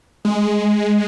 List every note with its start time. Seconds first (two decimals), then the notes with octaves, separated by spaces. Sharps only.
0.25 G#3